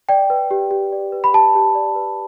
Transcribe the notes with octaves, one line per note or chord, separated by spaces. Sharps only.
D5 G5
B4
G4
G4
D5
B4
B5
G4 A5
G4
D5
B4